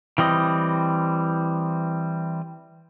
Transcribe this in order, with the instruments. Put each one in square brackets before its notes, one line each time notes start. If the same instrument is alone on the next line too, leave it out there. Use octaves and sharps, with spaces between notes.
[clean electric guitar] E3 G3 C4 D#5